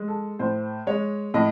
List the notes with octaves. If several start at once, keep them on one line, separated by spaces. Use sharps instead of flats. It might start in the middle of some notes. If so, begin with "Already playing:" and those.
Already playing: G#3
A4
A2 C5
G#3 C#5
A2 D#5